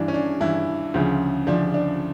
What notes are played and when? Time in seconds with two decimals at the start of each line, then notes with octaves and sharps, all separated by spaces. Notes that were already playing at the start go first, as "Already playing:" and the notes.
Already playing: G2 E3 D4
0.08 C#4
0.14 D4
0.41 G2 E3 E4
0.94 D2 C#3 F3
1.47 D2 C#3 F3 D4
1.74 D4